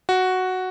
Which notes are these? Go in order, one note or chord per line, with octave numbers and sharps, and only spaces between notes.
F#4